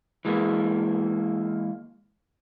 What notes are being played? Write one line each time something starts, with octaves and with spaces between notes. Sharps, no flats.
E3 G#3 A#3